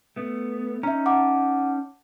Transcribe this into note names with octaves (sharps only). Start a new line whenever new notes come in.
A3 B3
C#4 D#4 E5 A#5
F#5 A5 D6